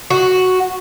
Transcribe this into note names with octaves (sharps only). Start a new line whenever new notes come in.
F#4